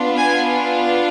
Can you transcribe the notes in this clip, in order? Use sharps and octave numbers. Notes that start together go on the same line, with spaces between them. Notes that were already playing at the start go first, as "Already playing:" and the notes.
Already playing: B3 D4 F4
G#5